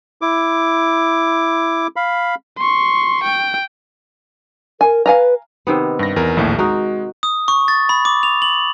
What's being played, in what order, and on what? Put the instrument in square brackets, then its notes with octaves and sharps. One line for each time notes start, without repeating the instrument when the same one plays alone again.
[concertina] E4 D6
F5 B5
[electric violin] C6 C#6
G5
[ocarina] A#4 [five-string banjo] G#5
[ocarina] B4 [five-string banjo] F5 G#5 A#5
[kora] C3 D#3 B3
[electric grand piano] G2 A#6
E2 A#4
A#1 D#2 A2
[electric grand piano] G#3 [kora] D#4 F#4 A#4
[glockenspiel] D#6
C#6
A6
B5
D6
F7
F#7